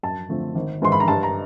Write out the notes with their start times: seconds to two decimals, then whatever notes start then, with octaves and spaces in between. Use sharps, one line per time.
0.03 F#2 A5
0.29 D3 F3 A3 C4
0.55 G#1
0.82 G#2 E3 G#3 C6
0.92 B5
1.00 A#5
1.08 G2 A5
1.23 A#5